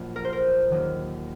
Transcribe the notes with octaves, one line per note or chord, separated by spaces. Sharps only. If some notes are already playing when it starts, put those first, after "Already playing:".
Already playing: A#1 A#2 F#3 A#3
A#4
C5
A#4
D#2 D#3 F#3 A#3